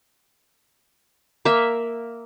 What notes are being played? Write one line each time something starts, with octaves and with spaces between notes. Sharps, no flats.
A#3 E5